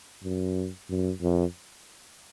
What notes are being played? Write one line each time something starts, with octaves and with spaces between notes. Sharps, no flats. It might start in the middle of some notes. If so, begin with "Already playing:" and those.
F#2
F#2
F2